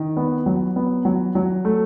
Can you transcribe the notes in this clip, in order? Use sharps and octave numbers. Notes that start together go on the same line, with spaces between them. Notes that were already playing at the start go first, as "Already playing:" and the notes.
Already playing: D#3
B3
F#3
B3
F#3
F#3
A3